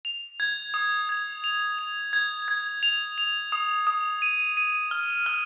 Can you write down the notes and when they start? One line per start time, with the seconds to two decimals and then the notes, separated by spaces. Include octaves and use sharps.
0.05 F7
0.40 G#6
0.74 D#6
1.09 G#6
1.44 F7
1.79 F7
2.13 G#6
2.48 G#6
2.83 F7
3.18 F7
3.52 D#6
3.87 D#6
4.22 D#7
4.57 D#7
4.91 F6
5.26 F6